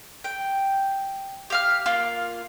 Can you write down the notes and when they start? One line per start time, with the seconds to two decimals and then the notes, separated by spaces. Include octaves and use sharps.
0.24 G5
1.50 G4 F5 F6
1.86 A#3 F4